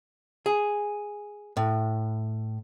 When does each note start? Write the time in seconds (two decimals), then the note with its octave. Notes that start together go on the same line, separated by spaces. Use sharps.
0.46 G#4
1.57 A2